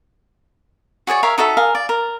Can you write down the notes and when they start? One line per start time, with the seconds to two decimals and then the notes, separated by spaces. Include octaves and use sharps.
1.07 F#4 G#4 C#5 D5
1.23 A#4 C#5 E5 F5
1.38 D#4 F#4 A4 E5
1.57 G#4 A#4 F5
1.75 D5
1.89 A#4